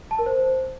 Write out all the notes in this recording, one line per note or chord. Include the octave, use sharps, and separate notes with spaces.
A5
A#4
C5